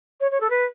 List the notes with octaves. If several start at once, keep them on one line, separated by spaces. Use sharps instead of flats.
C#5
C#5
A4
B4